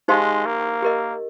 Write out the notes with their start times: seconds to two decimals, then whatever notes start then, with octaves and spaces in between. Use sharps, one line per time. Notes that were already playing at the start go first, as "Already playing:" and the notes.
0.08 G#3 D#4 G4 C5 F5 C6
0.46 A#3
0.82 G4 A#4 D#5